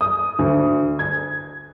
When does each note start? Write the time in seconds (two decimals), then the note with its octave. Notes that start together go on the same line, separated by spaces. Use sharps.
0.01 D#6
0.39 D2
0.99 G#6